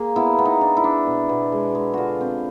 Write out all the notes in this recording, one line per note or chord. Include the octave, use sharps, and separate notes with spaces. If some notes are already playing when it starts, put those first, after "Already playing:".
Already playing: A#3 G#4
B3 E4
B3
D#4
D4
E4
D4
B2
B2
G#3
G#3
D3 F4 F#4
C4